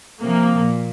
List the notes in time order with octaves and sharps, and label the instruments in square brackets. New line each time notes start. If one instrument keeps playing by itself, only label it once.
[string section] C3 F3 A#3
A#2